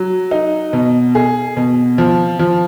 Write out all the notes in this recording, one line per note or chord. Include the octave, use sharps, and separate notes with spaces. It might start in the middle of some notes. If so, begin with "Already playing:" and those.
Already playing: F#3
D#4
B2
G#4
B2
F3
F3